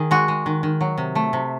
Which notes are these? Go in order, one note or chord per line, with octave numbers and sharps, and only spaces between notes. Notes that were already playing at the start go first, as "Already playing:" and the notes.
Already playing: D#3 G#4
G#3 F#4
G#3
D#3
D#3
F#3
C3
A3
C3